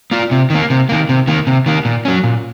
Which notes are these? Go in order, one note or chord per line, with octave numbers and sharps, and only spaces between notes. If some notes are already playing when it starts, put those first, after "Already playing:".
A#3 F4
C3
D#3 A#3
C3
D#3 A#3
C3
D#3 A#3
C3
D#3 A#3
A#2
F#3 C#4
A#2